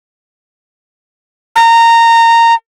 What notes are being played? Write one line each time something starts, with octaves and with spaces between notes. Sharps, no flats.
A#5